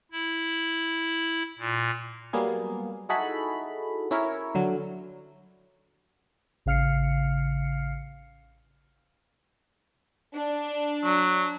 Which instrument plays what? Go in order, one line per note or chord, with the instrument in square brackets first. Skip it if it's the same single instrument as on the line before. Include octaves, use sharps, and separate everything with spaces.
[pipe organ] E4
A#2
[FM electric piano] F#3 G3 A#3 B3 G#4
D#4 E4 F#4 G#4 A4 B5
C#4 E4 A#4 C#5
D3 F#3
[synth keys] A1 C#3 F5 F6 C7 C#7
[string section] D4
[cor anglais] F#3